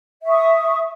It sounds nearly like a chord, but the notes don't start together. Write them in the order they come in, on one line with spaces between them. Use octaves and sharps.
E5 C#6 D#6